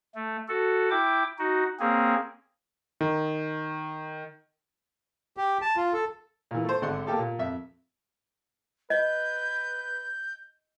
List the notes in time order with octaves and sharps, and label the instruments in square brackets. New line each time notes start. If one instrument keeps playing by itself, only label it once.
[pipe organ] A3
F#4 A4
E4 G5 D6
D#4 F#4
A#3 C4 C#4 G#4
[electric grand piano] D#3
[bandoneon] G4
A5
F4
A4
[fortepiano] A#2 E3
A3 C5
G#1 D3 D4 F#5 C6
A#3 G4 A4
A#2
F2 E5
[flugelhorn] B4 [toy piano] D#5 [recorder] G6